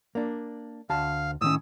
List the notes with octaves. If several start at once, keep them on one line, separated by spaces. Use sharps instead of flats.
A#3 D4
D2 F5 A5
A2 D#3 C#4 D#6 E6